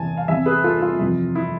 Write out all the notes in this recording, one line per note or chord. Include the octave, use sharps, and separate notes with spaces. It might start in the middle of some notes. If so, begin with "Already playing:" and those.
Already playing: E2 C3 E3 G#5 A5
F5
E2 C3 E3 E5 G#5
G#4 B4
F4 A4
F4
F2 C3 E3
E4